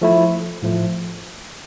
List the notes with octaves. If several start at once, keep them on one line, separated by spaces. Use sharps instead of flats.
F3 A3 E4
A2 F3 A3